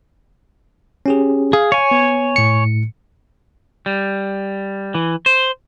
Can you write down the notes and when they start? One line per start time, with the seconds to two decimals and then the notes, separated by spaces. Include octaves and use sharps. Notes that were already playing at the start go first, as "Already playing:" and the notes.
1.06 C#4 G4 G#4
1.53 G#4 F5
1.72 C#5 G#5
1.91 B3
2.36 A2 C#7
3.86 G3
4.95 E3
5.26 C5